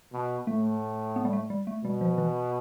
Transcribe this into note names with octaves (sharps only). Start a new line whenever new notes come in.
B2
A2 A3
B3
G3
A3
G3
A3
B2 G3
F3
E3